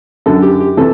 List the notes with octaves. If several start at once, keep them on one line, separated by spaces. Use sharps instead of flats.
F#2 D3 A4
G4
G4
C3 E3 A4